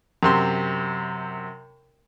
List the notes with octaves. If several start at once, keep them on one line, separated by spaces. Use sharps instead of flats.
F#2 C3 C6